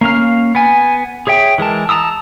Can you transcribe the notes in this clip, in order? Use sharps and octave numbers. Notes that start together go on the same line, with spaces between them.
A#3 C#4 F5 F6
B3 G#5
G#4 C#5 E5 G5
E3 G#3 A#4 A5
A5 A#5 D#6 E6